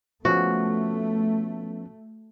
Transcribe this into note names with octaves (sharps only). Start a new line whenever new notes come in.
F3 A3 B3 C#4 F#4